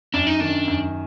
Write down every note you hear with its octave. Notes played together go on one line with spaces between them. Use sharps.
F#2 D4
D#4
D#3 D4
F#2